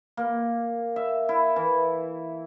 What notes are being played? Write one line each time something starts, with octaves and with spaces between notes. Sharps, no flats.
A#3
E5
E4
E3